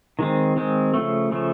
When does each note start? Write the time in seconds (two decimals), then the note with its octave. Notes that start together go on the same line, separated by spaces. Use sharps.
0.19 D#3 G#3 C4
0.56 D#3 G#3 C4
0.94 C#3 F3 A3
1.31 C#3 F3 A3